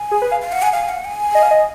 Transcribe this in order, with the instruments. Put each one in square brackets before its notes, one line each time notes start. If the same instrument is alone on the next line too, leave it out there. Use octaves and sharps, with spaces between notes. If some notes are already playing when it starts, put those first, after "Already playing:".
Already playing: [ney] G#5
[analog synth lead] G#4
B4
F5
[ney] F5
[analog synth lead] F5 [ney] F#5
[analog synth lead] F#5 [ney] G#5
[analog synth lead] F5 [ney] G#5
[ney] F#5
G#5
[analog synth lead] D#5
F5
D#5